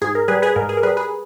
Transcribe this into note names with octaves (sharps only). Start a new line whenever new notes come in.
G#2 G#4
A#4
G3 G#4 B4
G#4 B4
G#2 A#4
G#4
A#4
G3 G#4 B4
G#4 B4